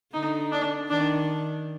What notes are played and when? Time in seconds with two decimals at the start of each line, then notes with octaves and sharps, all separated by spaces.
0.14 D3 D#4
0.52 D4
0.90 D#3 D4